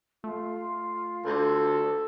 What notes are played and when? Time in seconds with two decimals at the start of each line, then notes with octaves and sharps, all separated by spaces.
0.24 A3 F4
1.25 D2 A4